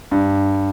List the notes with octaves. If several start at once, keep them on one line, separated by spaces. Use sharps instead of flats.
G2